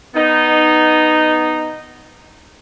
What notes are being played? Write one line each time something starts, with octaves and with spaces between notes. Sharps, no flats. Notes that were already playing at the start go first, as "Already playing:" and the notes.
B3 D#4